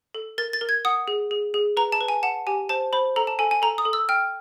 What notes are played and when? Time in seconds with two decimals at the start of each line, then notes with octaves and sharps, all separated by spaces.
0.15 A4
0.38 A#4 A6
0.53 A6
0.61 A#4
0.69 G#6
0.85 F#5 D#6
1.08 G#4
1.31 G#4
1.54 G#4
1.77 B4 A#5
1.92 A5
2.01 B4
2.08 G#5
2.23 F#5 A5
2.47 G4 G#5
2.69 C5 A5
2.93 C5 B5
3.16 A4 A#5
3.27 A5
3.39 A4 G#5
3.51 G#5
3.62 A4 A#5
3.78 D#6
3.85 A4
3.93 E6
4.09 G5 F6